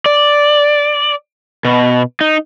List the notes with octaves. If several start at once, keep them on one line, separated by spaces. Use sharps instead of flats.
D5
B2
D#4